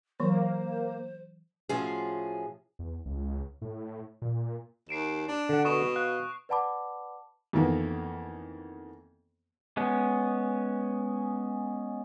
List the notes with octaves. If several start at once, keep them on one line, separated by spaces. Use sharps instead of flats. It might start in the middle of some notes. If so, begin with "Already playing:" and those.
E3 F#3 A#3 C5
A2 F3 C#4 F4 F#4 G#4
E2
C#2
A2
A#2
D#2 C7 D7 E7
D4
D3 F#5
B2 C#6 D#6 E7
F5 F#6
B4 D5 F#5 A5 B5 D6
F2 D#3 E3 A#3 B3
G#3 B3 C#4